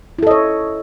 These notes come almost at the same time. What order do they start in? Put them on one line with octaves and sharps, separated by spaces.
E4 A4 D#5 C#5